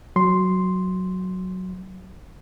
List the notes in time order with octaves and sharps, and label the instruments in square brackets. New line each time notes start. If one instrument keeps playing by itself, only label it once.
[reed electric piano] F#3 C6